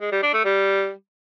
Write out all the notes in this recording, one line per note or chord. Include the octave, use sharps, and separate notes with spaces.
G#3
G3
D4
A3
G3